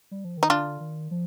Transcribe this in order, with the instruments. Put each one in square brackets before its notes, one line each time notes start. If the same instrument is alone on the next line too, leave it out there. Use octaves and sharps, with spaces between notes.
[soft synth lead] G3
F3
D#3
[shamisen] D#4
[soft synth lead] D3 [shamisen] D4 F4
[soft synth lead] D#3
F3